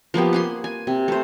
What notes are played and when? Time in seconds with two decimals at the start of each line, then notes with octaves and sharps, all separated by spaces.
0.14 F3 A#3 B3 G4
0.33 F#5 G#5 C6
0.64 G#5
0.87 C3
1.08 A3 C5